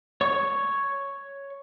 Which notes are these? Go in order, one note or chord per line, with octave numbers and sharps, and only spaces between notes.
C#5 C#6